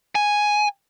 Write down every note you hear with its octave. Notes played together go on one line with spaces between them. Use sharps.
G#5